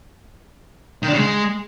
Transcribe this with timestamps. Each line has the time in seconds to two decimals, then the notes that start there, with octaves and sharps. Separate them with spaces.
1.02 D#3
1.08 D4
1.13 C#3
1.18 G#3